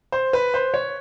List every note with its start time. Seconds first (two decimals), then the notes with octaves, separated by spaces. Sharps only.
0.12 C5
0.33 B4
0.54 C5
0.74 C#5